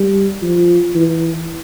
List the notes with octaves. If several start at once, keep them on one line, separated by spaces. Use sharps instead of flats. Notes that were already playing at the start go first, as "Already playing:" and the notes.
Already playing: G3
F3
E3